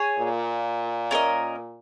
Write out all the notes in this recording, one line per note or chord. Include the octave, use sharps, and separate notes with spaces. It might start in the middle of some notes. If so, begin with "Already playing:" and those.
Already playing: G#4 C#5 G#5
A#2
C#4 A#4 D#5